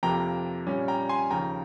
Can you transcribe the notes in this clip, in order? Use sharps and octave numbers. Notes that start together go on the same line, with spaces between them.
F2 C3 F3 A#3 G5 A#5
A#2 G3 C#4
G5 A#5
G#5 C6
D#2 C#3 F3 G5 A#5